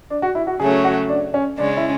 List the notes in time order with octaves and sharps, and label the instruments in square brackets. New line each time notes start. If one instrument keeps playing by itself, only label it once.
[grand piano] D4
F#4
E4
F#4
[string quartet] C#3 F#3 A3 C#4 [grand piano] G#4
[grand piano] F#4
D4
C#4
[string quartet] C#3 G#3 C#4 [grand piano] D4
[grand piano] E4